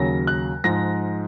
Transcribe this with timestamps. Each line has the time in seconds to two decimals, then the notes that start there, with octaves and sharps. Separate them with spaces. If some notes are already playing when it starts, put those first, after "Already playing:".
Already playing: D#2 C#3 F#3 A#6
0.27 F#6
0.64 G#2 F3 A#6